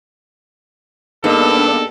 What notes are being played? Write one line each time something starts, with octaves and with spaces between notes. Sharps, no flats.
G2 A#3 B3 D4 D#4 G#4 A4 D5